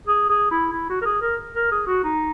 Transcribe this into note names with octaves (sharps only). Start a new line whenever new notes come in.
G#4
G#4
E4
E4
F#4
A#4
G#4
A#4
A#4
G#4
F#4
D#4